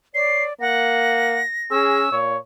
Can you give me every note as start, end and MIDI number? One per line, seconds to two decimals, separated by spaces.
0.15 0.47 73
0.15 0.54 74
0.15 0.43 96
0.61 1.40 58
0.61 1.41 78
0.61 2.02 94
1.71 2.11 61
1.71 2.04 68
1.71 2.16 88
2.12 2.35 46
2.12 2.38 73